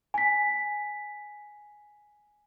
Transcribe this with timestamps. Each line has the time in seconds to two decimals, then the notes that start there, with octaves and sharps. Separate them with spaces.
0.14 G#5 B6